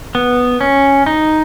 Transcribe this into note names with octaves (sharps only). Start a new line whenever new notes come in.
B3
C#4
D#4